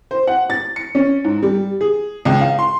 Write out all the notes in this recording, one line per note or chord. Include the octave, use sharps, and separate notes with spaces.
C5
F#5
A6
C#7
C#4
G#2
G3
G#4
C#2
F5
C6